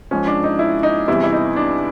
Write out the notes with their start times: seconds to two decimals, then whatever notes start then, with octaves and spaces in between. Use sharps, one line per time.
0.11 G#2 F3 C#4
0.27 D4
0.44 D#4
0.59 E4
0.83 D#4
1.08 E2 C3 E3 G3 E4
1.24 E4
1.32 D#4
1.56 D4